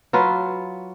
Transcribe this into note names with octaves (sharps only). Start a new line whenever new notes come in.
F#3 F4 B4